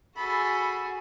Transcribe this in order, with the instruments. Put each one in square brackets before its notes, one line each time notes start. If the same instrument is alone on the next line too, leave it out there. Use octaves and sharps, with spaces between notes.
[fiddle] F#4 G#4 [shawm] A4 [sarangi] B5